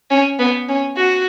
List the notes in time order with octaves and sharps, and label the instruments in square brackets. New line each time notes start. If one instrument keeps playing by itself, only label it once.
[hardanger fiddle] C#4
B3
C#4
F#4